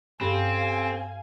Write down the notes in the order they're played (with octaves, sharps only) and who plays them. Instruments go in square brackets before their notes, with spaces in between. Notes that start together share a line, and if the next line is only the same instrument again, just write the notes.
[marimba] G2 [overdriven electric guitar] C4 [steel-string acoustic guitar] C#4 G4 A4 [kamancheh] F5 G#5